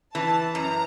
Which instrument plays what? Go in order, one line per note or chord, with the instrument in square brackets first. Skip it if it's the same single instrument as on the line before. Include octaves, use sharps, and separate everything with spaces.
[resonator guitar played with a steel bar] E3 [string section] A5
[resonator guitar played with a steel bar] F#2 [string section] A#5